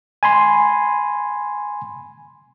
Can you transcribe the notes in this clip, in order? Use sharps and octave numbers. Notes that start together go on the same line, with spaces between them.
G#5 B5 C6